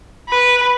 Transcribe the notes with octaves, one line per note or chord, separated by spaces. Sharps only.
B4